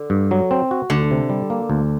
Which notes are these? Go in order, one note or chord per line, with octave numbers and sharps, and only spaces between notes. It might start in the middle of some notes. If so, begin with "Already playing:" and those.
Already playing: D3
G2
F#3
C4
F#4
D2 D3
C3
G3
A#3
D2